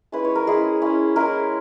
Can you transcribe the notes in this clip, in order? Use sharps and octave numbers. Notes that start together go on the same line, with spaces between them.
G#3 C#4 E4 B4
C#5
A#4
G#3 C#4 E4 G#4
G#3 C#4 E4
G#3 C#4 E4 A#4